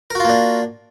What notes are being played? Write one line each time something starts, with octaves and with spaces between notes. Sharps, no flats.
A#3 D4 F4 F#4 A#4